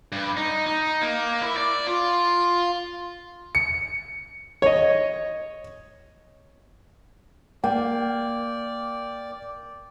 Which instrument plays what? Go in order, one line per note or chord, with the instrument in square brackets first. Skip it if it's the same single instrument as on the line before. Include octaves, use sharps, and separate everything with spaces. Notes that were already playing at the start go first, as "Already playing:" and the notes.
[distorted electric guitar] G2
D#4
D#4
A#3
E4
D5
F4
[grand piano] C#7
[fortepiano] C#5 D#5
[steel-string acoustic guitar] A#3 [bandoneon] D5 [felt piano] G5